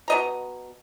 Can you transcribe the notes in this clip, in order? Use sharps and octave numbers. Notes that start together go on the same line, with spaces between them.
B2 D#5 A#5